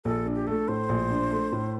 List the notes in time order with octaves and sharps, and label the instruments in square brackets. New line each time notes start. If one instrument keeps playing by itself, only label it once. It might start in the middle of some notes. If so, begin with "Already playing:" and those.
[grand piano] A#1 [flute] A4
[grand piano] D4
[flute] G4
[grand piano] A3 [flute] A4
[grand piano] A2 [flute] C5
[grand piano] A#1
D4
A3
A2